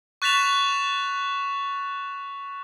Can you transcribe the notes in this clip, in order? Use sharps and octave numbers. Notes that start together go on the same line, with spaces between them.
C#6 F#6 A6 B6 E7 F7